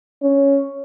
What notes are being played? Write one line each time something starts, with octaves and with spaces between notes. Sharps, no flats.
C#4